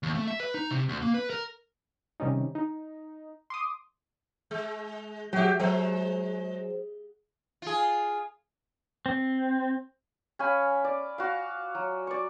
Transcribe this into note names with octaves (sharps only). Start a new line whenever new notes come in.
D#2
A3
E5
B4
D#4
C3
D2
A#3
B4
A#4
C3 D#3 G3 C#4 D#4
D#4
C6 D6 D#6
G#3
F#3 F#4 G4 E5
F#3 G#3 C5
F4 G#4
C4
C#4 F5 G#5 B5
D5
F#4 F5
F#3
D5 C#6